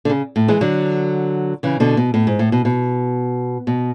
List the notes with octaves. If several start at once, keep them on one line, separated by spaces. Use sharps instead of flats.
D3
C#3
A2
E3 G#3
D3 F#3
C#3 E3
B2 D3
B2
A2
G#2
A2
B2
B2
B2